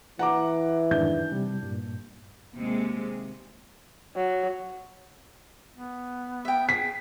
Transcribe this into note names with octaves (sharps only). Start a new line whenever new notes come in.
E3 F#5 A#5 D6
F2 G#2 D#3 D4 G6
C3 G3
G2 A#2
D#2 C3 G#3
F#3
B3
E5 G5
G#4 B6